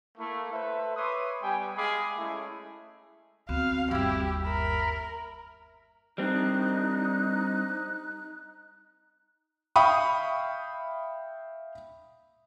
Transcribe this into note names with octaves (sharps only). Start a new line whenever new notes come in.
A3 A#3 E4
A4 B4 C5 E5
B4 C#5 E5 C6 D6 D#6
G3 B3 G4 G5 G#5
G#3 G#4 F5 G#5 B5 D6
G#3 A3 C#4 E4
D2 B3 C4 F#4 F5
G1 D#2 E4 G4
A#4 E5 B5
G3 C4 D4 D#4 F#6
E5 F5 G5 B5 C#6 D#6